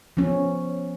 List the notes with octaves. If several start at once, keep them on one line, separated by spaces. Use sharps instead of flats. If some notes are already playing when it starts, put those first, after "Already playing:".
F3 B3 C#4